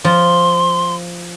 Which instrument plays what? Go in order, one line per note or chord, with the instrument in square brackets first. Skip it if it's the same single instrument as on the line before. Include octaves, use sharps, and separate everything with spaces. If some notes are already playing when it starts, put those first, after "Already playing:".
[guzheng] F3 [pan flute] C6